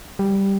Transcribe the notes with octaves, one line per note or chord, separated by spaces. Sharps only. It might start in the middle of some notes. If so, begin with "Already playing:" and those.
G3